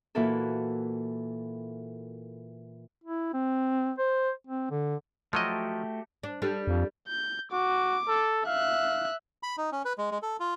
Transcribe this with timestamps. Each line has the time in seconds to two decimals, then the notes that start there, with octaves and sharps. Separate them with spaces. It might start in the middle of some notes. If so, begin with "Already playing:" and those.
0.15 A#2 E3 E4 F#4 A4
3.04 E4
3.33 C4
3.98 C5
4.47 C4
4.71 D3
5.33 F3 F#3 A3 F#4 G4 D#5
6.23 D4
6.42 G3 D4 A4
6.67 F2
7.08 G6
7.52 F#4 D6
8.08 A4
8.47 E5 F5 F#6
9.43 B5
9.57 D#4
9.72 C#4
9.85 B4
9.98 G#3
10.11 G#3
10.23 A4
10.40 F4